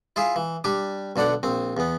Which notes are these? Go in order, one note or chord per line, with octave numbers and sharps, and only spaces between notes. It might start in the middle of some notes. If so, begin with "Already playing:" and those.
E4 F4 G#4 E5
E3
G3 D4 G4
B1 D3 D4 D5 F#5
A#1 C4
E2 B3